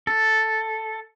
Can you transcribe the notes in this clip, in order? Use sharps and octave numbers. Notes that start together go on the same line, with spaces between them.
A4